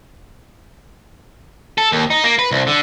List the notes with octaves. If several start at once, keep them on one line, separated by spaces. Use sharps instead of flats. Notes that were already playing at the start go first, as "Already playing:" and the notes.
A4
D#2
D#4
A#3
B4
C2
D3